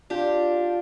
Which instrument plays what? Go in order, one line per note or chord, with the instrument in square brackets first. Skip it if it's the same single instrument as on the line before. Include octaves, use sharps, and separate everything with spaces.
[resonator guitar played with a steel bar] D4 G4 [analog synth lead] F4